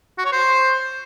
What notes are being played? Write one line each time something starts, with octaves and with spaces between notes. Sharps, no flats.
F#4
C#5
C5